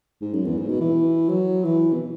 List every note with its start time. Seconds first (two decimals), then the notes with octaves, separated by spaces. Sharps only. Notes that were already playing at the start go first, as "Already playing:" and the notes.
0.21 G#2
0.33 F#2
0.45 E2
0.57 G#2
0.69 B2
0.81 E3
1.29 F#3
1.65 E3
1.93 B2